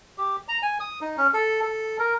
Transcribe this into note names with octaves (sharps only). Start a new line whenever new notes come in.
G4
A#5
G#5
D#6
D#4
C#4
A4
A4
A#4